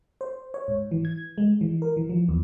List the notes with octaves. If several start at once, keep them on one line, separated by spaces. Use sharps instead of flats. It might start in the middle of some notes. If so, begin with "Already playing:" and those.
C5
C#5
G#2
E3
G#6
G#3
E3
A#4
E3
F3
E2